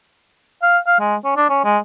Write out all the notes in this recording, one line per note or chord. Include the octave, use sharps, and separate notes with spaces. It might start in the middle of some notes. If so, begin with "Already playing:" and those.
F5
F5
G#3
C#4
D4
C#4
G#3